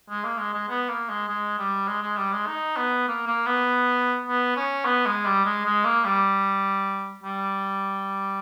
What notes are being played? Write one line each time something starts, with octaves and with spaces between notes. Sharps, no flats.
G#3
A#3
G#3
G#3
B3
A#3
G#3
G#3
G3
G#3
G#3
G3
G#3
D#4
B3
A#3
A#3
B3
B3
C#4
B3
G#3
G3
G#3
G#3
A#3
G3
G3